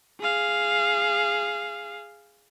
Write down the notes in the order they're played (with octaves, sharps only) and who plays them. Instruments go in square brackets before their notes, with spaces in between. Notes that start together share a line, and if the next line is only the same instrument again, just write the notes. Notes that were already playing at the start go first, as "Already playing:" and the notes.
[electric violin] G#4 F5